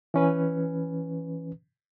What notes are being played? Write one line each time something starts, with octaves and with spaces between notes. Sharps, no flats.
E3 C#4 B4